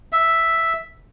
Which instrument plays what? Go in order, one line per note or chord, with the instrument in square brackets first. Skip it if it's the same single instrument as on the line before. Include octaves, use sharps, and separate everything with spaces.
[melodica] E5